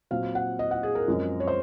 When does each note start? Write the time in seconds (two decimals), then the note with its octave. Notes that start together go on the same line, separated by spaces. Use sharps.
0.11 A#2 F#3 C4 F5
0.35 F#5
0.59 D#5
0.71 F#5
0.83 G#4
0.95 A#4
1.08 F#2 F3 G#3 C4
1.40 C#5
1.48 C5